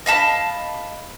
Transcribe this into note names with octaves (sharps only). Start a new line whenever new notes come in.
D#5 F5 A5 B5